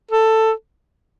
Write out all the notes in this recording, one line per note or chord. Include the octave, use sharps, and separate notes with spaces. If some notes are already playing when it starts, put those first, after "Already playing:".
A4